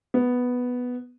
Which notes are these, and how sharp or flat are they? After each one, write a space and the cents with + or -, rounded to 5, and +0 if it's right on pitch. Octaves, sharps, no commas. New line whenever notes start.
B3 +0